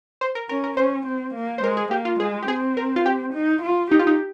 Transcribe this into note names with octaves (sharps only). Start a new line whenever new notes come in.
C5
A#4
C#4 A#4
A#4
C#4 C5
C4
A#3
C5
G#3 A#4
G#4
A#3 G4
F4
G#3 G#4
G4
C4 G#4
A#4
F4
G4
D#4
F4
D#4 G4
F4
D#4